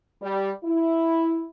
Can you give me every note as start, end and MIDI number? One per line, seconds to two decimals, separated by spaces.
0.22 0.50 55
0.64 1.44 64